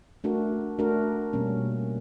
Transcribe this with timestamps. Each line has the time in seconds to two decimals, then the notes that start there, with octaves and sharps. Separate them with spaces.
0.24 A3 D4 F#4 A#4
0.79 A3 D4 F#4 A#4
1.33 B2 G3 A#3 C#4